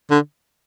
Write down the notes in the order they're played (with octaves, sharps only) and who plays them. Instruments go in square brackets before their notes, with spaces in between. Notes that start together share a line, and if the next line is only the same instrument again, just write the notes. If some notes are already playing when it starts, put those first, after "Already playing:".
[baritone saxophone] D3